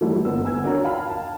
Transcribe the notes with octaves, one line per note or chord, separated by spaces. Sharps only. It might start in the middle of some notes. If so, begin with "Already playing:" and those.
E3 F#3 G3 A3 E4
G1 B3 C4 A#4 E6
G#5 E6 G#6
D4 F#4 A#4 C#5 A#5
F5 G5 A5 B5 F6
A5